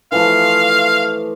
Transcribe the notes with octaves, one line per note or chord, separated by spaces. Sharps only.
E3 F3 A3 F5